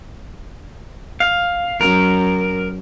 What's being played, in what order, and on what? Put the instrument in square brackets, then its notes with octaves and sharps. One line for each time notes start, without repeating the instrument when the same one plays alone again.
[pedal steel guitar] F5
[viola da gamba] F#2 [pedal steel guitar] A#4